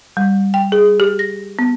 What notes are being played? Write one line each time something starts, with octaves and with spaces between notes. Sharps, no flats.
G3
G5
G#4
G4
A#6
B3